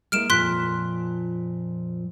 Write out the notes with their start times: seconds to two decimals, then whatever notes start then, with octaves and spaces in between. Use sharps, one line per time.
0.12 G#3 A#3 E4 F6 D7 E7
0.30 F2 A#2 F3 C6 F#6 B6